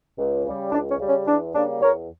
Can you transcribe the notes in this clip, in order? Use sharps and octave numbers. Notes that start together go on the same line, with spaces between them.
C#2
C#3 G3
C#2 D4
C#4
C#3 G3
C#4
E2 D4
C#3 G3 A#3 D4
E2 A#4 C#5